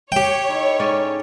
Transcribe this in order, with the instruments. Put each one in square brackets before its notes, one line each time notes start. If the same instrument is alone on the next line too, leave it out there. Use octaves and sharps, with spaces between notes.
[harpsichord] G4 G5 [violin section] C#5
[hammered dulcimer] D#4 E4 A4
[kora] G#2 C#4 D5